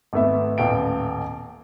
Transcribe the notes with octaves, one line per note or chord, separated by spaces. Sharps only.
G#1 A3 B3 E5
D#1 A1 B3 F5 G5 D7